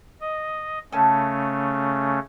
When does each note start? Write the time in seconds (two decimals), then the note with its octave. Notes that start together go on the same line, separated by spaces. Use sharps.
0.21 D#5
0.92 C#3 A3 C#4 A4 G#5 A5